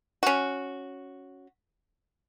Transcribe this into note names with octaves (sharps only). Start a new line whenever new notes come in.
C#4 F#4